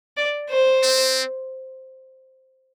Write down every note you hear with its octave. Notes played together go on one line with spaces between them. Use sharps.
D5
C5
C4